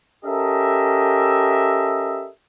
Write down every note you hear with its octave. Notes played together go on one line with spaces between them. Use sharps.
C#4 G4 A4 A#4 D#5 E5